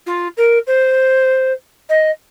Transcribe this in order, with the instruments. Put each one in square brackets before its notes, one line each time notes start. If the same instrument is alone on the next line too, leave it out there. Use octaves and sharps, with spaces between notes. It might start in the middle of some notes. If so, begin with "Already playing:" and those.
[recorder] F4
A#4
C5
D#5